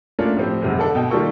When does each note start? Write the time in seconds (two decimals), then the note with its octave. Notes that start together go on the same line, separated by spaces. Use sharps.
0.19 A3 A#3 C#4 D4 F4
0.37 A2 F3 C4 G4
0.62 F1 G#2 C3 F#3
0.78 D3 D4 A4
0.95 B2 G5
1.10 D#3 G3 A#3 F4 A4 C#6